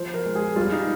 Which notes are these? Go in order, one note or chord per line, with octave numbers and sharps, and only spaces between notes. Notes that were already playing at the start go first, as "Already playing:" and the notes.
Already playing: F3 C5
A#4
G#3
G#4
G3 F4
D#4